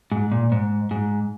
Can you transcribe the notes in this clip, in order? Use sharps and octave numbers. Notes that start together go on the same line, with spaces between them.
G#2
A#2
G#2
G#2